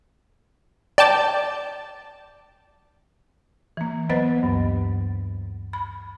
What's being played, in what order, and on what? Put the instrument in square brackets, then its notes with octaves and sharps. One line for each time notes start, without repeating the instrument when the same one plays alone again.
[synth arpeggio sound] D5 G5 A5
[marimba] E3 A#3
F#3 B3 B4 C5 D#5 A6
D2 G2
B5